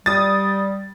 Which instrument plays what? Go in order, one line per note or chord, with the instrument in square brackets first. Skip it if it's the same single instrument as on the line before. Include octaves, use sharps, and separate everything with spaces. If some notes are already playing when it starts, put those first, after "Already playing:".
[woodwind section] G3 [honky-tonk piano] D#6 A6